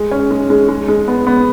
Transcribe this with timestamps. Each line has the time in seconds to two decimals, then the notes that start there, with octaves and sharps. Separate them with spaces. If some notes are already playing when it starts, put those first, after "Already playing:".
Already playing: G#3
0.11 C#4
0.31 G#3
0.50 G#3
0.69 G#3
0.88 G#3
1.08 B3
1.27 B3